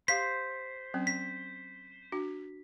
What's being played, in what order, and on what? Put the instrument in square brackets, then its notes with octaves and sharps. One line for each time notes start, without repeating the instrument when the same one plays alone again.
[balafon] G4 F5 C6 [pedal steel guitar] C5 [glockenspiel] B6
[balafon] F#3 C4 C#4
[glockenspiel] B6
[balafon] D4 F#4